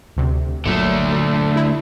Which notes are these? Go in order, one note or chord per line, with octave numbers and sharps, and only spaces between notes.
D2 C3
G1 A#2 D3 F#3 A3
E4